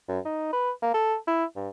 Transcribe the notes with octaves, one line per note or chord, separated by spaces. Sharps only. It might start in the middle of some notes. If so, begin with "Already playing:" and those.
F#2
D#4
B4
A#3
A4
E4
G2